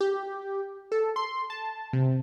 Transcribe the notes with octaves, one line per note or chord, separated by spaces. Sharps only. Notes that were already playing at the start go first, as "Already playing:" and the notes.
G4
A4
C6
A5
C3